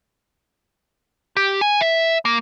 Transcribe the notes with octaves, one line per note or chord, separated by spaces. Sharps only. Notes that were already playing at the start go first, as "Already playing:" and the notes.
G4
G#5
E5
A#3